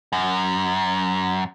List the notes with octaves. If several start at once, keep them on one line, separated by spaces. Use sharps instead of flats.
F#2